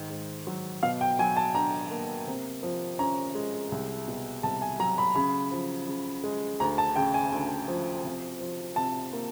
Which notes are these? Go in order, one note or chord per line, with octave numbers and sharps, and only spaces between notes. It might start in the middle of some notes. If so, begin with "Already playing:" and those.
Already playing: G#2 D#3
G#2
F#3
B2 F5
G5
F#3 G#5
A5
D4 A#5
A#3
C3
F3
C#4 A#5
G#3
C2
B2
C2 A5
G#5
F#3 A#5
B5
C#3 B5
F3
C#3
G#3
D2 A#5
A5
C#3 G5
G#5
D2
F3
C3
F3
C3 A5
A#3